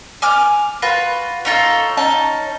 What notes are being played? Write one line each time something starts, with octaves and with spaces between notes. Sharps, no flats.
G#5 D6 F6
F4 F#4 B4
C#4 D#4 F4 A4
C#4 D#4 A5